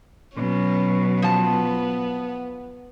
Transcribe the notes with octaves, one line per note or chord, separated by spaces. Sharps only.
B2 F#3 C#4
F3 B3 A5